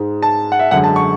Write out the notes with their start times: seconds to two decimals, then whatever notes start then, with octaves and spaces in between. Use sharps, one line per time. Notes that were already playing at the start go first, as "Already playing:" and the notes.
Already playing: G#2 G#3
0.23 A5
0.52 F#5
0.59 E5
0.71 F#2 D3 G#3 F#5
0.84 A5
0.96 C#6